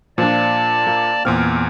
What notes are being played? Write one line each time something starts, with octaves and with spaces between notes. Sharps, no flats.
A#2 F3 D4 D5 A5
A#3
E2 A#2 C4 F6